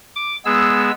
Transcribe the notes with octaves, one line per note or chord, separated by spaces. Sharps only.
D6
G#3 B3 G#4 E6